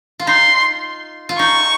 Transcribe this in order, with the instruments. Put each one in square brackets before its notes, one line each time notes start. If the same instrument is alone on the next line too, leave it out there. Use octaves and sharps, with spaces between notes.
[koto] F4
[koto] D#4 [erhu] C6
[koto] F4
[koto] D#4 [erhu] C#6